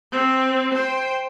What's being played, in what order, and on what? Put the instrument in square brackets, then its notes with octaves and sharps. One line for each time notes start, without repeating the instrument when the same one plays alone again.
[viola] C4
C5 G5